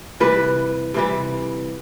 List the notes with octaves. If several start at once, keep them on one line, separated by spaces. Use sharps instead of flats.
C3 E3 G3 B4
C3 E3 G3